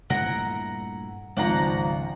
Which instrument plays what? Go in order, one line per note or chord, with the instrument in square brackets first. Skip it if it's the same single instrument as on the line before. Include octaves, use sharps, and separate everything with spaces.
[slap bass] G2 A#2 A3 [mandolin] E4 F#5 A#5
[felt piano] G#1 F3 [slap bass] C#2 [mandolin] D5 F#5 A#5